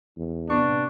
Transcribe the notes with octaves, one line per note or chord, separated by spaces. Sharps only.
E2
C3 B3 D4 C#6